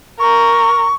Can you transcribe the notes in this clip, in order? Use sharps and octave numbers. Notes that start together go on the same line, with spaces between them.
A#4 C#6